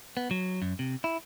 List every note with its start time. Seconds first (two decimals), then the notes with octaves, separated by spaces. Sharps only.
0.17 B3
0.31 F#3
0.62 F#2
0.79 C3
1.04 E4